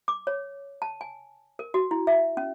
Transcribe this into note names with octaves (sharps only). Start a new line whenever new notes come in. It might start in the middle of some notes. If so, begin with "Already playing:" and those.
D6
C#5
A5
G#5
A#4
F#4
E4
E5
C#4